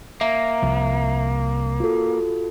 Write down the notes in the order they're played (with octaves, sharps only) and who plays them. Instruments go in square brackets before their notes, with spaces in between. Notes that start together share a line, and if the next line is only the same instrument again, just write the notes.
[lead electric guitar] A#3 [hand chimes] E5 A#5
[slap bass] C2 F3
[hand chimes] F4 F#4 A4